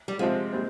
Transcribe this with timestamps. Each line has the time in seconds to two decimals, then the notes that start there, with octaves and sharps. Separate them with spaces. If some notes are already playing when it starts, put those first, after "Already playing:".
0.08 G3
0.19 C3 F3 G#3 C4 F4
0.52 A#2 G3 C4